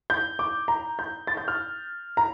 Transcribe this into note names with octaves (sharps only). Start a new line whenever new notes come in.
G6
D6
A#5
G6
A6
G6
F6
A#5